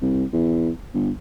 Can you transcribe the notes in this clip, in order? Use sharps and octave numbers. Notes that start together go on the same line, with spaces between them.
C2
E2
G1